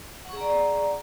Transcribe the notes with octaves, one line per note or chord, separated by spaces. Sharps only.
G#4 D5 F#5 A#5 C#6